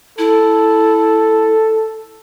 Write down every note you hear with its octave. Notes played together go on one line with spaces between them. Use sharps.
E4 A4